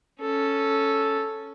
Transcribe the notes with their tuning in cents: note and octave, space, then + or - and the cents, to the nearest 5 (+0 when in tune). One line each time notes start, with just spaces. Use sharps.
C#4 +0 A4 +0